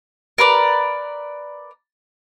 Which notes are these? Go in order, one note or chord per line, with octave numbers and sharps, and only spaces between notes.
A#4 B4 D5